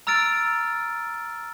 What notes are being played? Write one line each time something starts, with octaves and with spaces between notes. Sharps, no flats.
A#5 E6 F6 A6 D7